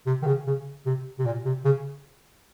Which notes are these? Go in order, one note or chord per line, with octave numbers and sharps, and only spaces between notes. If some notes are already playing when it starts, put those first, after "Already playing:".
C3
D#3
C#3
C#3
C3
C3
A#2
C3
C#3